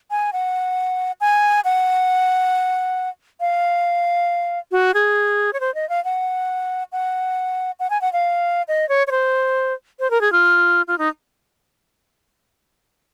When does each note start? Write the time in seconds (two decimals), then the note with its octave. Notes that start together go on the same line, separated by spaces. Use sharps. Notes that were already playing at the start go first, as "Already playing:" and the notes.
0.11 G#5
0.33 F#5
1.21 G#5
1.65 F#5
3.40 F5
4.72 F#4
4.94 G#4
5.53 C#5
5.60 C5
5.75 D#5
5.89 F5
6.05 F#5
6.92 F#5
7.80 F#5
7.90 G#5
8.01 F#5
8.13 F5
8.68 D#5
8.89 C#5
9.07 C#5
9.11 C5
10.00 C5
10.11 A#4
10.21 G#4
10.32 F4
10.88 F4
10.98 D#4